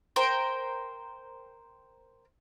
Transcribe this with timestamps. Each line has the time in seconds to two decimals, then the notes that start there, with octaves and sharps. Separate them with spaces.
0.16 A#4 C5 G5